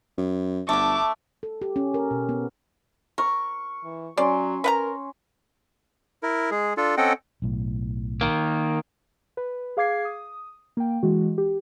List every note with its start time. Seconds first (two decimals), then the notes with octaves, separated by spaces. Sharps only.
0.18 F#2
0.69 G1 D3 A3 A5 D6
1.43 A4
1.62 G4
1.76 C#4
1.94 A#4
2.11 B2
2.29 B3
3.18 A#4 C#6
3.84 E3
4.17 F#3 C#4 D5 C6
4.64 A#4 B4 F#5 A#5
6.23 E4 A#4
6.51 G#3 G#4
6.77 D4 F4 A4
6.97 C4 C#4 A4 D#5 F#5 G5
7.42 B1 A2
8.21 D#3 A#3
9.37 B4
9.77 G#4 F5 D6 G#6 C7
10.05 D#6
10.77 A#3 G5
11.03 E3 G#3 F#4
11.38 G4